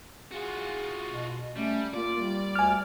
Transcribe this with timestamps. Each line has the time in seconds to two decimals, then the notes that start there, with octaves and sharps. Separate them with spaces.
0.31 F4 F#4 G#4
1.11 B2
1.56 G3 A3 C#4
1.94 A#3 F4 D5
2.19 G3
2.56 D2 G#5 F6